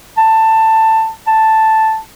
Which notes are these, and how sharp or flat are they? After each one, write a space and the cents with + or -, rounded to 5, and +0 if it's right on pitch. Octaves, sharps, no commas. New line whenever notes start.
A5 +15
A5 +0